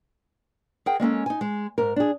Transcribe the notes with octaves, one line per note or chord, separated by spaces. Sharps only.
G#4 A#4 F#5 G5
G#3 A#3 C#4 A4
D#4 G#5
G#3
G#2 A#4
D4 G#4